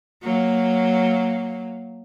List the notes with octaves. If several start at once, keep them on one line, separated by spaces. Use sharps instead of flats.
F#3 A#3